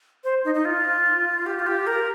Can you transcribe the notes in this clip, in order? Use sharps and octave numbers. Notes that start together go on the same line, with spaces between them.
C5
D#4
D#4
F4
G4
F4
G4
A#4